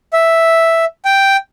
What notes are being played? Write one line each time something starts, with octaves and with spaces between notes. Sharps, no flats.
E5
G5